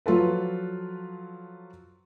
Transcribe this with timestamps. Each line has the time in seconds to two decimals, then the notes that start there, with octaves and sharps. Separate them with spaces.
0.06 F3 F#3 F4 A4 B4